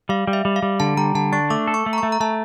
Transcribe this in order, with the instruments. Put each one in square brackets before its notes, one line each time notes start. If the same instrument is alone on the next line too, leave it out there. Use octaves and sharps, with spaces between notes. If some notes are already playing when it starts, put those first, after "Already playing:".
[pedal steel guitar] G3 [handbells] F5
[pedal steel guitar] G3
[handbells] E5
[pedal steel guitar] G3
[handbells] F5
[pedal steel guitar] G3
[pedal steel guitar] D3 [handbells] A5
[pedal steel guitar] G3 [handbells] A#5
[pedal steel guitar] D3 [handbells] A5
[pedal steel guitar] D4 [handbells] C#6
[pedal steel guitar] A3 [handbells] D6
[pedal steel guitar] A4
[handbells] C#6
[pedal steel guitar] A3
[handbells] A#5
[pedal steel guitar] A3 [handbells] C#6
[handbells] A#5
[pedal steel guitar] A3 [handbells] A5